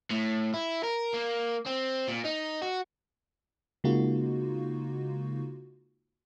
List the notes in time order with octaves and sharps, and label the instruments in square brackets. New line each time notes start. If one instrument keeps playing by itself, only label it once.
[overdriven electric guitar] A2
E4
A#4
A#3
C4
A#2
D#4
F#4
[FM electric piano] C#3 G#3 A#3 D#4 F4 F#4